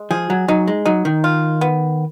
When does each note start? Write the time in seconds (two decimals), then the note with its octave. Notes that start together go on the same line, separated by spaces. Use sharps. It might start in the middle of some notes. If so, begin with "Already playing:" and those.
Already playing: G#3
0.11 F3 G#4
0.30 F#3
0.48 F#3 D#4
0.68 G#3
0.86 F#3 D#4
1.05 D#3
1.24 F4
1.61 B3